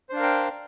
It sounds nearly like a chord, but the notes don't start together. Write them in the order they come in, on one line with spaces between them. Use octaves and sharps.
C5 D4 F5 A#4 G5